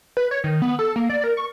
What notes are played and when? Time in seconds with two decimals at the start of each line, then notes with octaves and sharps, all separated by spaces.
0.17 B4
0.31 C#5
0.44 D#3
0.62 B3
0.79 A4
0.96 A#3
1.09 D5
1.24 A#4
1.37 C#6